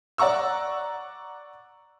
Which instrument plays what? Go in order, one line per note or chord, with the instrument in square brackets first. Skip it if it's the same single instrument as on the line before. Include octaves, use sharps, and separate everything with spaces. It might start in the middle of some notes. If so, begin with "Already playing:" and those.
[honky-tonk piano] D5 F#5 A#5 C#6 E6